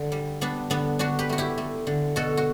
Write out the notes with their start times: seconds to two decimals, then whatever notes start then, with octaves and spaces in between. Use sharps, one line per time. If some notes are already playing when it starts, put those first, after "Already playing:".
Already playing: D3
0.12 G3
0.41 G3 B3 D4
0.70 D3 B3 D4
0.99 D3 D4 F#4
1.19 G4 B4
1.29 A3 F#4
1.38 E4 G4
1.58 A3
1.87 D3
2.16 B2 F#4 A4
2.37 F#4